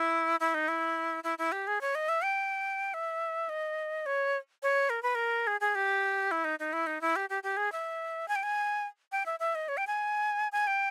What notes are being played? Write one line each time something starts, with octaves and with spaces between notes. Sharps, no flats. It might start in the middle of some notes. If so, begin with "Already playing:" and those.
Already playing: E4
E4
D#4
E4
E4
E4
G4
G#4
C#5
D#5
E5
G5
E5
D#5
C#5
C#5
A#4
B4
A#4
G#4
G#4
G4
E4
D#4
D#4
E4
D#4
E4
G4
G4
G4
G#4
E5
G#5
G5
G#5
G5
E5
E5
D#5
C#5
G5
G#5
G#5
G5